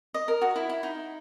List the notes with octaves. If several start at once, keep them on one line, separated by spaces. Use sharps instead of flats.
D#5
A#4
F#4
E4
E4
D#4